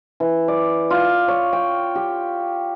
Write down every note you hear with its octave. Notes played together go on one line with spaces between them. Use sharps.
E3
D5
F4
C#5
G5
G4